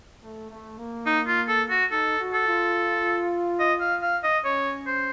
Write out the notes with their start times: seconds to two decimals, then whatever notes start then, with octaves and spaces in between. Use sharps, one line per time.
0.22 A3
0.51 A3
0.79 A#3
1.06 D#4
1.27 F4
1.49 A4
1.71 F#4
1.91 D#4 A4
2.19 F#4
2.34 A4
2.47 F4
3.60 D#5
3.81 F5
4.03 F5
4.24 D#5
4.45 C#4 C#5
4.87 C5